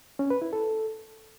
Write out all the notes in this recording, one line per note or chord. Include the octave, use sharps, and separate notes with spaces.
C#4
B4
E4
A4